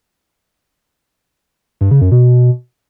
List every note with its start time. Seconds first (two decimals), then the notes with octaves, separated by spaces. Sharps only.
1.81 G2
1.91 C#3
2.01 F#2
2.12 B2